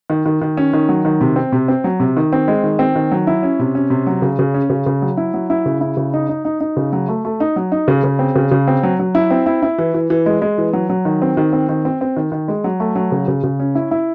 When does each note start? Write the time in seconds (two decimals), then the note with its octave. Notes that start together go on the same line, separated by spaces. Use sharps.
0.10 D#3
0.26 D#3
0.42 D#3
0.57 C#4
0.73 D#3
0.89 F#3
1.05 D#3
1.21 C3
1.36 C4
1.52 C3
1.68 C4
1.84 F#3
2.00 C3
2.17 D#3
2.33 C4
2.48 G#3
2.63 D#3
2.79 C4
2.96 D#3
3.11 F#3
3.27 E4
3.43 C#4
3.59 C3
3.75 C#4
3.90 C3
4.07 F#3
4.22 C#3
4.39 C#3
4.54 C#4
4.70 C#3
4.86 C#3
5.02 F#3
5.17 E4
5.34 F#3
5.50 E4
5.66 C#3
5.81 E4
5.97 C#3
6.14 D#4
6.29 D#4
6.45 D#4
6.61 D#4
6.77 C#3
6.93 F#3
7.08 A3
7.25 A3
7.40 D#4
7.56 F#3
7.72 D#4
7.88 C#3
8.04 C#3
8.19 C4
8.35 C#3
8.51 C#3
8.68 C4
8.83 F#3
8.99 F#3
9.15 E4
9.31 C4
9.46 E4
9.62 E4
9.78 E3
9.94 E3
10.10 E3
10.26 G#3
10.42 G#3
10.58 E3
10.73 F#3
10.89 F#3
11.05 D#3
11.22 C4
11.37 D#3
11.53 C4
11.69 D#3
11.85 C4
12.01 C4
12.17 D#3
12.32 D#3
12.48 G#3
12.64 F#3
12.80 A3
12.95 F#3
13.12 C#3
13.28 C#3
13.43 C#3
13.60 C#4
13.75 E4
13.91 E4